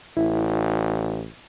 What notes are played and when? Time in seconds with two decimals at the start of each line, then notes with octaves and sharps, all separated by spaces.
0.17 A1 E4